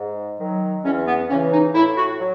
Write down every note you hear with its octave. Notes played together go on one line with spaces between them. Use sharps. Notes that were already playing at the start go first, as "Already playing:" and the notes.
Already playing: G#2
D#3 F#3
E2 C#4
B3
C#3 E3 C#4
D#4
A2 E4
F#4
F#3